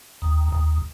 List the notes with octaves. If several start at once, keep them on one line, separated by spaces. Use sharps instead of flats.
D#2
D#2